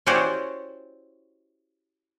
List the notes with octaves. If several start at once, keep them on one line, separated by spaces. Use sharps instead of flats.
C#4 E4 F#4 G4 C5 D5